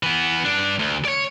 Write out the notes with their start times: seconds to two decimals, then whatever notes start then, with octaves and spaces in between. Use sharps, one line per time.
0.03 E3 B3
0.45 G2 D4
0.79 D2
1.05 C#5 D5